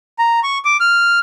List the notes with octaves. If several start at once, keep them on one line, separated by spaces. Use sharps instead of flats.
A#5
C#6
D6
F6